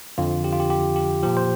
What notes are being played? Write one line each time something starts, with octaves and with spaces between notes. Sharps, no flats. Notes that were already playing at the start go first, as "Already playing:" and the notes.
F2 D3 F3 F4
G4
F4
G4
G4
G4
A#2 F3 G4
C5